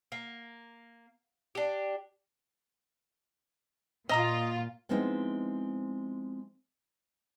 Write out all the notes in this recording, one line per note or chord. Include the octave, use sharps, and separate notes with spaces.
A#3
D4 G4
A#2 F4 D#5 A#5 D#6
F3 G#3 B3 C4 D#4 E4